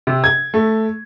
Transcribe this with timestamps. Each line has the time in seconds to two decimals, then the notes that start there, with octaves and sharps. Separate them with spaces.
0.07 C3
0.24 G#6
0.54 A3